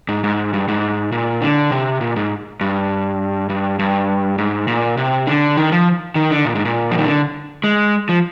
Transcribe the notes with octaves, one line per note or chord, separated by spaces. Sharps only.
G#2
G#2
G2
G#2
A#2
D3
C3
A#2
G#2
G2
G2
G2
G#2
A#2
C3
D3
D#3
F3
D#3
D3
A#2
G#2
A#2
F3
D#3
D3
G#3
F3